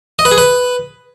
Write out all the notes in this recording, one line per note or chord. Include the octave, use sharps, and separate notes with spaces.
D#5
B4
G#4
B4